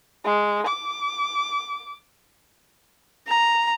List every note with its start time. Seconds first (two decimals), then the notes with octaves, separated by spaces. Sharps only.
0.24 G#3
0.67 D6
3.27 A#5